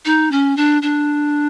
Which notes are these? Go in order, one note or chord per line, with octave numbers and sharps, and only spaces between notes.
D#4
C#4
D4
D4